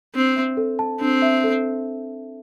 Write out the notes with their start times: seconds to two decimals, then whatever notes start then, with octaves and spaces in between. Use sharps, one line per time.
0.15 C4 D4
0.36 E5
0.57 A4
0.79 A5
1.00 C4 D4
1.22 E5
1.44 A4